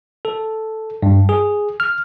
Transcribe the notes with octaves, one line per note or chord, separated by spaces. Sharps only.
A4
G2
G#4
F6